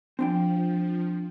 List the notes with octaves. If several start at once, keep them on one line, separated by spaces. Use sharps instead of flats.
F3 C4 D4 G5